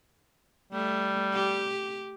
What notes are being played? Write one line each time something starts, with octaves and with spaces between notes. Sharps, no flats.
G3 A3
G4